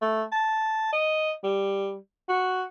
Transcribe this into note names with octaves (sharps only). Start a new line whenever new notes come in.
A3
A5
D#5
G3
F#4